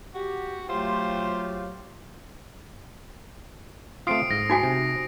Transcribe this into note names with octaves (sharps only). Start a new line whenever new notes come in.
F#4 G4
F#3 A3 F4 G4 C5
A3 C4 F4 D#6 C7 D7
G#2 A#6
D#4 F#4 G#5
C3